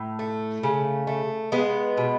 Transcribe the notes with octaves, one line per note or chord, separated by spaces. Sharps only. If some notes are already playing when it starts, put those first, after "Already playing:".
Already playing: A2
A3
C#3
A3
G#3 B3
B2